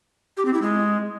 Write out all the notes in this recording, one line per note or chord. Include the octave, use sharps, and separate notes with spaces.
G4
C4
E4
G#3